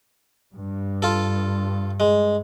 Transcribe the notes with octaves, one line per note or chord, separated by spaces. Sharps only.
G2
F4 A4
G#3